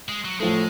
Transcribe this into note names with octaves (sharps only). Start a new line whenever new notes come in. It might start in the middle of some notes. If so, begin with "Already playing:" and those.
G#3
F#3
A2 F3 G#3 A3